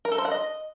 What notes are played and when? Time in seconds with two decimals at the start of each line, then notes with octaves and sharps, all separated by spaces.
0.05 A#4
0.12 A4
0.18 C5
0.25 F#5
0.31 D#5